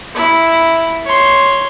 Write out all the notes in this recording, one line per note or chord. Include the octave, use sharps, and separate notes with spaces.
E4
C#5 C6